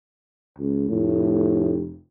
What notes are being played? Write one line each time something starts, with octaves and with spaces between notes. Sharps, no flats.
C#2
F1 A2